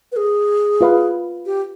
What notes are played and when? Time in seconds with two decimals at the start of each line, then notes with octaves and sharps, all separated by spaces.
0.12 B4
0.17 G#4
0.81 F4 B4 F5 C6
1.46 G4